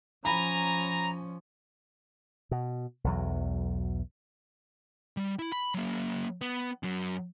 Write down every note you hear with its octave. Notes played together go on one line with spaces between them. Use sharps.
F3 C#4 G#5 A#5 B5 A#6
B2
B1 E2 F#3
G3
E4
B5
F#3 A#3
B3
F#2 F#3